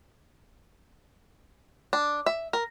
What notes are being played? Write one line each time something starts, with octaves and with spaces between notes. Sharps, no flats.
D4
E5
A#4